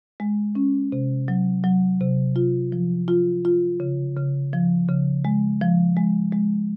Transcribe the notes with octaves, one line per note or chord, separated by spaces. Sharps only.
G#3
C#4
C3
F#3
F#3
C3
F4
F3
F4
F4
C#3
C#3
F3
C#3
G#3
F3
G#3
G#3